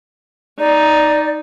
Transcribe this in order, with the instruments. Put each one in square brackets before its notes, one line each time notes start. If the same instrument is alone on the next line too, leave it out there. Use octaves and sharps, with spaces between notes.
[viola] D#4 [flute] D5